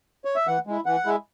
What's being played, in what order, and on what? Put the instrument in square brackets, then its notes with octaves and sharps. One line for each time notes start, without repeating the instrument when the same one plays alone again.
[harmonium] C#5
E5
E3 F#5
G#3 E4
E3 F#5
G#3 E4